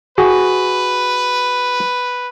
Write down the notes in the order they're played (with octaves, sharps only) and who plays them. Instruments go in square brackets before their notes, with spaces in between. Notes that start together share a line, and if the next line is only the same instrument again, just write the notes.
[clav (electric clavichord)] F#4 G#4 [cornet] B4